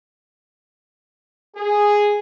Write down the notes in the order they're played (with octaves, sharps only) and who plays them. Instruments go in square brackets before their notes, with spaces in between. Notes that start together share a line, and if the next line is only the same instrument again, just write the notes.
[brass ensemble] G#4